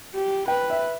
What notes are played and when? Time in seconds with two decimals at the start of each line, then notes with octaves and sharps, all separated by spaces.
0.15 G4
0.48 B4 G5
0.70 E5